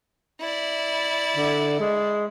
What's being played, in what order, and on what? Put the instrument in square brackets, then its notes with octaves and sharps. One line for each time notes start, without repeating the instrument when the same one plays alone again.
[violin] E4 D5
[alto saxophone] D3
G#3